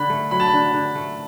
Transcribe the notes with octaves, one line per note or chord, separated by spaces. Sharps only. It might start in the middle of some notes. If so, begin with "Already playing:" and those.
Already playing: D3 B5
A3
F#3 B5
A5
B5
D3
D3
A3